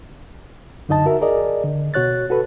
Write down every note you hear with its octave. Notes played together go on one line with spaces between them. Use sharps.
F#2 D3 D#4 D#5 A5
F#4 A#4 E5
G#4 A#4 D5 D#5
D3
B2 F#4 C#5 F#6 A6
F#4 A4 B4